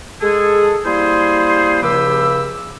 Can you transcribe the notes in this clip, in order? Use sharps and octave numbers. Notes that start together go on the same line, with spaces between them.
G#3 G#4 A4
G3 A#3 E4 G#4 C5 C6
C#2 C#3 F3 G4 B5 E6